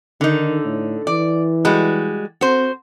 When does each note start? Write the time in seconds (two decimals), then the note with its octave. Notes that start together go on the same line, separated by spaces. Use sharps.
0.21 D3 D#3 D#4
0.64 A2
1.07 E3 D5
1.65 G3 G#3 F#4
2.41 C4 F#4 C5